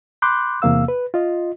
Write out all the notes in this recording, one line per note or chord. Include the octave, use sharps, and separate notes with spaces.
B5 C6 D6 F#6 G6
E2 C3 A#3 F5 E6
B4
F4 D#5